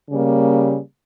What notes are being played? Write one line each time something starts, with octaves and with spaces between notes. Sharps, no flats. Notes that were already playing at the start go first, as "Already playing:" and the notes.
C#3 G3 A#3